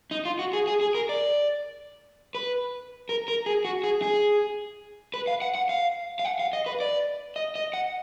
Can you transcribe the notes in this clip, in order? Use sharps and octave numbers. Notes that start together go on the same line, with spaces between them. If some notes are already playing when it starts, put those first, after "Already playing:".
D#4
F4
F#4
G#4
G#4
G#4
A#4
D5
B4
A#4
A#4
G#4
F#4
G#4
G#4
B4
F5
F#5
F#5
F5
F5
F#5
F5
D#5
B4
D5
D#5
D#5
F#5